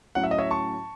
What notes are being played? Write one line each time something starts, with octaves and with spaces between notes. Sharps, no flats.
A2 F#3 C#4 F#5
E5
D#5
C#5 E5
A5 C#6